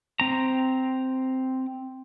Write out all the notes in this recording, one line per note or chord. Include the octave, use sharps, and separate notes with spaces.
C4 A#5